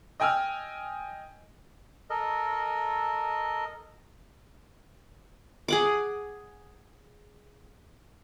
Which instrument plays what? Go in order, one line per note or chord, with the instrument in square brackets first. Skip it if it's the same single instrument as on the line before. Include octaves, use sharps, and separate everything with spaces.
[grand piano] D#5 G5 G#5 E6 F6
[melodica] A4 A#4 D#5
[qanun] G#4 F#5 D6